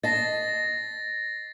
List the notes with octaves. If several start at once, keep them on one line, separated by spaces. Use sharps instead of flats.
D#5 A5 A6 A#6 C7